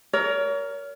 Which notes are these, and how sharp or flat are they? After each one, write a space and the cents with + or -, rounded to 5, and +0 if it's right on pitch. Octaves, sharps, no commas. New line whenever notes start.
A#4 +0 C#5 +35